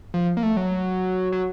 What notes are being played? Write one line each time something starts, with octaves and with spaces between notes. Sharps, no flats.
F3
A#3
A3
F#3
F#3